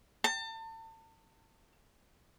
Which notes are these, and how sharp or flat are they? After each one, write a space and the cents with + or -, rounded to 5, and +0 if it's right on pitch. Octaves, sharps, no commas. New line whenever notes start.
A5 +35